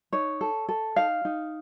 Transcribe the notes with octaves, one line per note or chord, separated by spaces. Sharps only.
D#4 C#5
A4
A4
D#4 F5
D#4